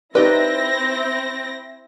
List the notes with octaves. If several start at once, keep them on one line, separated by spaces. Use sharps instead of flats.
C4 D#4 E4 G4 B4 D5 A#6